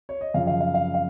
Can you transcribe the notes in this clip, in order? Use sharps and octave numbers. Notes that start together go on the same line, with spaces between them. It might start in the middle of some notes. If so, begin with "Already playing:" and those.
C#5
D#5
F#2 C#3 F3 F5
F5
F5
F5
F5